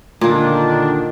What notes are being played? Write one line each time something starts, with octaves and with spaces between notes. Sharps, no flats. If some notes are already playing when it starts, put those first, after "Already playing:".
A#2 D3 D#3 A#3 D4